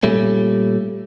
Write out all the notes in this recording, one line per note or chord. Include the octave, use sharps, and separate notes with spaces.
A#2 G3 A3 C#4